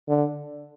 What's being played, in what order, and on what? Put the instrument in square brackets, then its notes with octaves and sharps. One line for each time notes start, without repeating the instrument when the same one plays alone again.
[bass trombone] D3